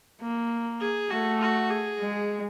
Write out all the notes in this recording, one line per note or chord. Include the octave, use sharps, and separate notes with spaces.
A#3
G#4
A3 F#4
F#4
G#4
G#3